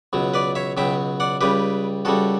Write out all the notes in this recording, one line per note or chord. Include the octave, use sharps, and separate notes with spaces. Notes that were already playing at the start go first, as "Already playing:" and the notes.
C#2 B2 F#3
B4 D5
C#5 E5
C#2 B2 F#3 E5 G5
D5 F#5
C#2 C#3 G3 G4 B4
C#2 C#3 G3 F#4 A4